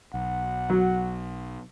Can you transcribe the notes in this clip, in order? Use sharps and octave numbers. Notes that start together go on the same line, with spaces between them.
B1 F#5
F#3